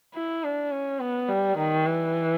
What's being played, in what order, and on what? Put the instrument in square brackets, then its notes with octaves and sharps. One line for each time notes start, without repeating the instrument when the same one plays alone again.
[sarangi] E4
D4
C#4
B3
G3
D#3
E3